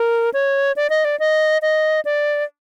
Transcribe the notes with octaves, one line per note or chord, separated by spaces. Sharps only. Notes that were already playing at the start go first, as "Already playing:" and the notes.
Already playing: A#4
C#5
D5
D#5
D5
D#5
D#5
D5